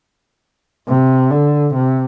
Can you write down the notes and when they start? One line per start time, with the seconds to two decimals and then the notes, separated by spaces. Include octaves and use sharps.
0.88 C3
1.31 D3
1.75 C3